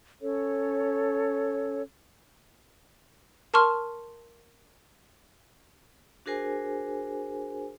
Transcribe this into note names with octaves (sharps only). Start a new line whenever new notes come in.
C#4 A4 C#5
A#4 A5 C6 C#6 F6
D4 F#4 G#4 A#4 C5 G#5